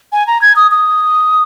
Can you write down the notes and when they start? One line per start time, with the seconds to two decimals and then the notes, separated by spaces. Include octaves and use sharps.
0.12 G#5
0.27 A#5
0.42 G#6
0.56 D#6
0.71 D#6